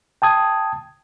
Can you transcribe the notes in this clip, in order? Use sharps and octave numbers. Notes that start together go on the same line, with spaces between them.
G5 A5 D#6 G#6